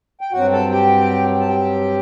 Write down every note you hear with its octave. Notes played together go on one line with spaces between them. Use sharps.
G5
G2 F#3 C4 F#4 F#5
A4 A5
G4 G5
A5
G4 G5